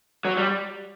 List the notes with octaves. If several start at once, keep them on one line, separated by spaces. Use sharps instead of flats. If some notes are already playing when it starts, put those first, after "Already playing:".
F#3
G3